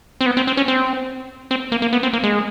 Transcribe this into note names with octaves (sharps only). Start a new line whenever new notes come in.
C4
B3
C4
C4
C#4
C4
C4
A#3
A#3
B3
C4
A#3
G#3